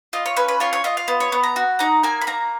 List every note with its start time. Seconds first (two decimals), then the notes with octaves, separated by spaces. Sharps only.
0.13 F4 D#5
0.26 C#5
0.37 C#4 B4
0.48 B4
0.60 F4 C#5
0.73 C#5
0.84 F4 D#5
0.97 F5
1.08 B3
1.20 C#5
1.32 B3
1.43 A#5
1.56 F#4
1.79 D#4 A#5
2.03 A#3 G#5
2.21 B5
2.27 A#3 A#5